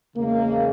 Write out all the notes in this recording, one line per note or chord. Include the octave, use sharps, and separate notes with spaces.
E2 C#3 G#3 A#3